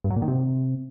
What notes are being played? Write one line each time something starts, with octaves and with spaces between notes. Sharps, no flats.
G2
F#3
A#2
D#3
C3